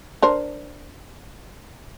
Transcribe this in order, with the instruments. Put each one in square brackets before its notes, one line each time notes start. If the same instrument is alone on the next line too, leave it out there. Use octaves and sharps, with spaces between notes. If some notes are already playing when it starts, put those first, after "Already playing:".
[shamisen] D4 A#4 C5